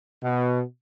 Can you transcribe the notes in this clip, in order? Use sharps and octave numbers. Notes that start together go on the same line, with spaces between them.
B2